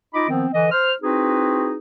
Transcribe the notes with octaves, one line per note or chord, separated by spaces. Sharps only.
D#4 F4 D#5 B5 D6
D#3 F3 B3 C4
D3 E3 D#5
C5 F6
C4 D#4 E4 F#4 G#4 B4